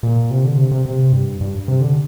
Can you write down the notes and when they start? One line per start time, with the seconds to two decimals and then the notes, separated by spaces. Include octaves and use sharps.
0.03 A#2
0.31 C3
0.44 D3
0.58 C3
0.71 C3
0.86 C3
1.12 G2
1.41 G2
1.68 C3
1.81 D3